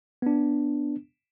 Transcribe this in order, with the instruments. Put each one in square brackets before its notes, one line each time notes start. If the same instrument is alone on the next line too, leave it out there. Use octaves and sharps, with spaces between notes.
[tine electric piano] B3 D4